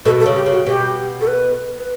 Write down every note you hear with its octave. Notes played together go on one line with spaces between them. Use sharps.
B2 A4
A4
C#3
G4
C#3 F#4
B2 G4
A4
B4
B4